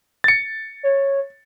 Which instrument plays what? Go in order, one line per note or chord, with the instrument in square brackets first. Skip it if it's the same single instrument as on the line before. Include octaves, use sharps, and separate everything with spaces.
[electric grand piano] A6 C#7
[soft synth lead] C#5